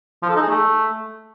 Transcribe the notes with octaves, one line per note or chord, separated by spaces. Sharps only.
F3
A4
D#4
G#4
A3